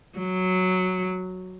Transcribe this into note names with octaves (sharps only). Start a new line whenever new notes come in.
F#3